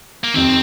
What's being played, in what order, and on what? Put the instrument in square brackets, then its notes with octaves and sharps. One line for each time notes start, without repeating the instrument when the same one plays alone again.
[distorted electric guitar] A#3
[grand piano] F2 C3 D#3 [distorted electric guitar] C4